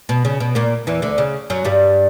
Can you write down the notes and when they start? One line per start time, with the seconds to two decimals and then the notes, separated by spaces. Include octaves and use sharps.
0.09 B2
0.25 C#3
0.40 B2
0.55 A#2 A#3
0.87 E2 E3
1.02 D2 D3
1.18 C#3
1.50 F#2 F#3
1.65 G2 G3